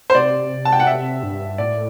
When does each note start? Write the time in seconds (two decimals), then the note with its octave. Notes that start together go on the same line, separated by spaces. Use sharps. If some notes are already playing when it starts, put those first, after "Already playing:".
0.10 C5
0.15 C3 D5
0.65 A5
0.73 G5
0.80 F#5
0.87 E5
1.23 G2
1.58 A2 D5